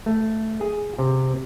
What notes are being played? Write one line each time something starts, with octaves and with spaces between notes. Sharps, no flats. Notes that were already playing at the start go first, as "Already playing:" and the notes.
A3
G#4
C3